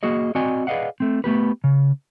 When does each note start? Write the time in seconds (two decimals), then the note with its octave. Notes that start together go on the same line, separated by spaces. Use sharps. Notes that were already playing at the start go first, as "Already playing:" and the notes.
0.03 A#3 F#4 G#4 D#5
0.35 C4 F#4 D5 D#5 G#5
0.67 G#4 B4 D5 D#5 F5 F#5
1.00 A3 C4
1.24 A3 B3 G4 B4
1.64 C#3